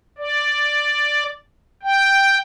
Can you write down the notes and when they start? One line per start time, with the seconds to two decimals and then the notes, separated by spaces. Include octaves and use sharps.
0.18 D5
1.83 G5